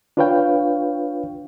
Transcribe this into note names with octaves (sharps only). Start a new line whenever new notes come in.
D4 F4 B4 C#5 F5 G5